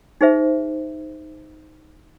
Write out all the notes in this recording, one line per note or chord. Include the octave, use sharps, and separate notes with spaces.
D#4 G#4 C5 E5